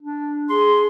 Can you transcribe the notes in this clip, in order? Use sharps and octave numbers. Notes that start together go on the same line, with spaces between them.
D4
G#4 C6